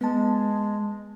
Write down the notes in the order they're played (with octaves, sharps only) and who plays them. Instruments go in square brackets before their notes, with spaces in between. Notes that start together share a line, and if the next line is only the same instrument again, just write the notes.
[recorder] G#3 [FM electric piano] B3 A5